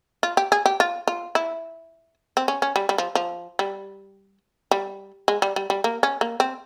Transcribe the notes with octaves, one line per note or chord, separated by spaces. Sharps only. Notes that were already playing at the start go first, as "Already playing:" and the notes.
F4
G4
G#4
G4
F4
F4
E4
C4
C#4
C#4
G3
G3
F3
F3
G3
G3
G#3
G3
G3
G3
A#3
C#4
A#3
C4